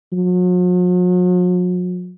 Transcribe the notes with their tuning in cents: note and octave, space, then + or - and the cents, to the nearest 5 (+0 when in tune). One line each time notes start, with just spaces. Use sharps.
F#3 -45